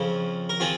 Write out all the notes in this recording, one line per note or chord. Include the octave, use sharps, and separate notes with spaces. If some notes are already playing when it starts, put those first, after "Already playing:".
Already playing: F2 C#3 F3 C4
A#4
F3 C4 F4 G#4